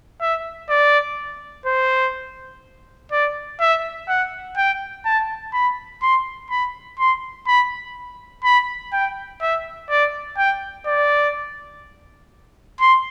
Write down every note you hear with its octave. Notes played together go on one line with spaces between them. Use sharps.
E5
D5
C5
D5
E5
F#5
G5
A5
B5
C6
B5
C6
B5
B5
G5
E5
D5
G5
D5
C6